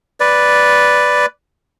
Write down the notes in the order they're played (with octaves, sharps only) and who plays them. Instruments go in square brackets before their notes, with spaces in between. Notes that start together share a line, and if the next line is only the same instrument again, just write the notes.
[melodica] B4 D5